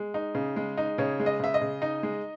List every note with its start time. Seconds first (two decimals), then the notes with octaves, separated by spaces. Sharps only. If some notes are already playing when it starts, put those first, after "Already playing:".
Already playing: G#3
0.14 D#4
0.35 C#3
0.56 G#3
0.78 D#4
0.98 C#3 C#5
1.20 G#3
1.26 D#5
1.40 C#3 E5
1.54 D#5
1.61 C#3
1.82 D#4
2.03 G#3